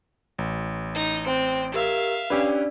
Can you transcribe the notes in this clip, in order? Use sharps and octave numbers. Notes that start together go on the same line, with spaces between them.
A1
D#4
C4 C5 G5
G4 A#4 E5 F5 E6
C#4 D4 G4 B4 D5 E6